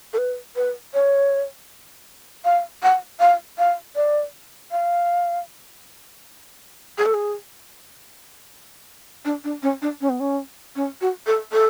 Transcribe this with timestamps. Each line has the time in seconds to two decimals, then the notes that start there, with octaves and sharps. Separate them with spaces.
0.13 A4
0.18 B4
0.56 B4
0.94 C#5
2.45 F5
2.83 F#5
3.20 F5
3.58 F5
3.96 D5
4.71 F5
6.98 G#4
7.06 A4
7.14 G#4
9.25 D4
9.44 D4
9.63 C#4
9.82 D4
10.01 C#4
10.10 B3
10.20 C#4
10.76 C#4
11.01 F#4
11.27 A4
11.52 A4